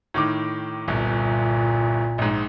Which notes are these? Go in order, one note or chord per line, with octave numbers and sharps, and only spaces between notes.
A2 D#3 D6
G1 C2 A#2
A#1 G#2